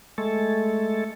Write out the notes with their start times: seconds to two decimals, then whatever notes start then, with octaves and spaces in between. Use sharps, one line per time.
0.18 G#3 A3 A4